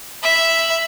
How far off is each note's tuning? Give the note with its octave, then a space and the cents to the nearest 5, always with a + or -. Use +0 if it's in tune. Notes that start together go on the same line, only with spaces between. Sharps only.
E5 +0 B5 +0